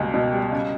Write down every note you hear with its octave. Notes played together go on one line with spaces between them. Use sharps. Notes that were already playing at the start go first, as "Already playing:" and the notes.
Already playing: C#2 B2 G3 A#3 G4
B2
G3
C#3